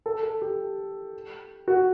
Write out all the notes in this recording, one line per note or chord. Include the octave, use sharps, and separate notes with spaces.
A4
A4
G4
F#4